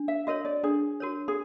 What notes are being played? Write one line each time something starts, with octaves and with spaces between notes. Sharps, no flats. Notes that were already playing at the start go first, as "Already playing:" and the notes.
Already playing: D4
E5
F#4 A#4 C#5 D#5
D5
D4 G#4
F#4 A#4 C#5
G#4